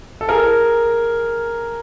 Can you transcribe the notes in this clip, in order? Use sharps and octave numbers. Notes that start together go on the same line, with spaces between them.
A4
G#4 A#4